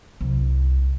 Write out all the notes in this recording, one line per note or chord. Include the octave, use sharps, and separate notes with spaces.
C2 F#3